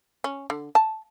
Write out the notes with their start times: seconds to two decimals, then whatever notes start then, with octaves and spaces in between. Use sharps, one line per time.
0.24 C#4
0.50 D3
0.75 A5